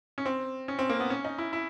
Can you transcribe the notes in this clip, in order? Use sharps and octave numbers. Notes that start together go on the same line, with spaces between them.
C#4
C4
C#4
C4
A#3
B3
C#4
D#4
E4
E4